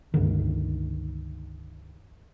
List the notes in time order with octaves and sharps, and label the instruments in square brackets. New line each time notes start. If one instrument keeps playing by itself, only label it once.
[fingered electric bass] C#2 G2 D3 D#3